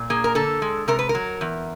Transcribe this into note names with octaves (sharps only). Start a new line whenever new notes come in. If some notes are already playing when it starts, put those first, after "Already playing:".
Already playing: A#2
A#3 G#4
A#4
D3 A4
G#3
C3 A#4
B4
A#4
F#3
E2